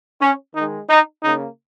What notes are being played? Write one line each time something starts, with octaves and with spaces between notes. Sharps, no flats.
C#4
D#3 G#3 D#4
D#4
C#3 A#3 D#4